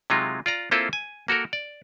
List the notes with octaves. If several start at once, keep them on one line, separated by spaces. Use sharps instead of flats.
C3 F#3 G#3 D#4 F4
F4 D5 A#5
A#3 C4 E4 F4 A4 C5
G#5
A#3 F#4 A4 A#4
D5